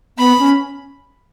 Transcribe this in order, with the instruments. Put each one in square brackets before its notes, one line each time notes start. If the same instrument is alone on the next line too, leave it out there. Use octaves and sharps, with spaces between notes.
[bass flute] B3 [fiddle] B5
[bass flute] C#4